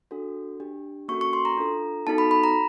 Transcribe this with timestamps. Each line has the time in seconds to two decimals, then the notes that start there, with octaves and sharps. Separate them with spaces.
0.11 D4 F#4 A4
0.60 D4 G4
1.08 A#3 C#4 F#4 A4 C#6
1.21 C#6
1.33 C6
1.45 A#5
1.57 D4 F4 A4
2.07 B3 D#4 F#4 A4 A5
2.18 B5
2.31 B5
2.44 A#5